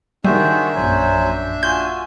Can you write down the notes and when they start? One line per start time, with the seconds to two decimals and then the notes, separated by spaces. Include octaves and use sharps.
0.25 D#3 G3 D4 F#4 G#4 C5 E5
0.75 A#1 F#2 F#3 C5 G#5
1.63 F4 F#4 G#5 G6